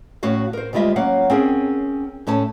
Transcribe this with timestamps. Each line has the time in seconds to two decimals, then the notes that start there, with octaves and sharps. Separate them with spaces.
0.23 A2 A3 C#4 F#4 F5
0.53 A#4 C5
0.73 D2 G3 G#3 F4 D#5 E5
0.96 F#3 A#3 C#4 F5 F#5
1.30 C4 C#4 G#4 A#4
2.27 A2 A3 C#4 A5